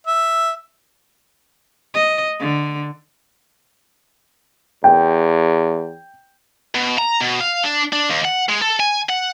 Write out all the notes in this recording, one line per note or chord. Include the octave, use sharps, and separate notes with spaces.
E5
D#5
D3
E2 G5
B2
A#5
B2
F5
D4
D4
D#2
F#5
G#3
A4
G#5
F#5